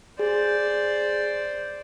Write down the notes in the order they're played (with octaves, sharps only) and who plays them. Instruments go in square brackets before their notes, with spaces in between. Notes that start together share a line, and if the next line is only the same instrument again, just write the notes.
[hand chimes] G#4 [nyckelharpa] C5 D5